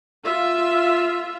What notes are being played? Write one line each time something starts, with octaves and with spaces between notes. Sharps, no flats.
F4 E5